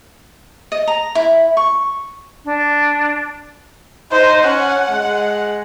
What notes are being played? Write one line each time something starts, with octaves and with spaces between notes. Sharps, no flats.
D#5
A#5
E4
C#6
D4
D#4 C5
C#4 F#5
G#3